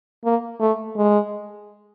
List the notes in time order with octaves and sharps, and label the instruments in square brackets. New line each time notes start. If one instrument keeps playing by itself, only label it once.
[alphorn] A#3
A3
G#3